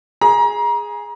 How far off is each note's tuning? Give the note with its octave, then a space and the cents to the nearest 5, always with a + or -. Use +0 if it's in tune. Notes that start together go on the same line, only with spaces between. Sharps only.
G#4 +0 A#5 +30